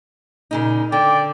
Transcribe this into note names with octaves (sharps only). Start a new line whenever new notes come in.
A#2 C#3 D#4
D3 D5 G5